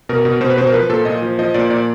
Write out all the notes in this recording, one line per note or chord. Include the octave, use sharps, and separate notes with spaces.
B2 A#4
B2
B2 C5
B4
B2 C5
A#4
F3 B4
A#2 A4
A#2 D#5
F3
F3 D#5
A#2 D5
A#2 D5